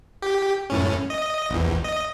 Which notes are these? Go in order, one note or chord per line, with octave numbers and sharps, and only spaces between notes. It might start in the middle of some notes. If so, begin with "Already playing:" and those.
G4
F#2 A2 C#4
D#5
A#1 E2
D#5